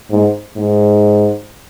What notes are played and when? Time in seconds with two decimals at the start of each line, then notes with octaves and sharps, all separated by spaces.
0.10 G#2
0.57 G#2